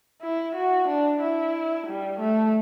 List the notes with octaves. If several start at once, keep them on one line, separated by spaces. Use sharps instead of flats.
E4
F#4
D4
E4
G3
A3